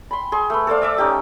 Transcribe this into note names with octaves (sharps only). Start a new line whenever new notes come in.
B5 C6
G#4 C6
A3 B4
A4 C5 D5 F5
D5 E5 D6
C#4 D#4 G4 D#5